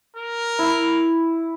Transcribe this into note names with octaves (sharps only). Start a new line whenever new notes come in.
A#4
E4